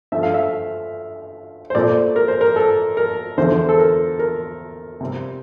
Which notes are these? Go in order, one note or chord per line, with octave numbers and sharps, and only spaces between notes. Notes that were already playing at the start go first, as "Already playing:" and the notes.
G2 F3 A3 E5
F5
E5
C5
A#2 A3 C4 D5
A#4
C5
A#4
A4
A#4
E2 D3 F3 A3 C4 C5
A4
A#4
A#4
C3 G3 C4